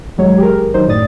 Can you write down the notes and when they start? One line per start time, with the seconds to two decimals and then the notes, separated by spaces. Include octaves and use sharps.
0.18 A1 D#2 F#3 G#3 C#5
0.38 G4 G#4 A#4
0.61 G#1
0.74 D#3 F#3 D#4 C5
0.87 F#2 A2 D5 D#6 A6